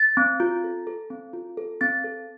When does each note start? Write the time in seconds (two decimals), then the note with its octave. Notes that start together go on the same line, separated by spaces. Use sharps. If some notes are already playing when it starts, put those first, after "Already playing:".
Already playing: A6
0.17 C4
0.40 F4
0.64 A4
0.87 A4
1.10 C4
1.33 F4
1.57 A4
1.81 C4 A6
2.04 A4